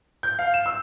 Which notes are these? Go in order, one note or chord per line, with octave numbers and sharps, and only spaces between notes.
G6
F5
E7
E6